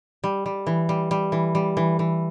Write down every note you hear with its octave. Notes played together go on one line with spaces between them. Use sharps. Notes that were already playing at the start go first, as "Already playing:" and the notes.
G3
G3
E3
G3
G3
E3
G3
E3
E3